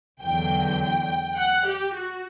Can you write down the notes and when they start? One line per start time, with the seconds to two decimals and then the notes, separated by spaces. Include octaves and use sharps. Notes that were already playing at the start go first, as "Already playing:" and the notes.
0.21 E2 D3 F#3 G5
1.36 F#5
1.65 G4
1.94 F#4